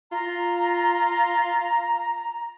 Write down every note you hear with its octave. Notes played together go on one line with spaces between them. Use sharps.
F4 A#5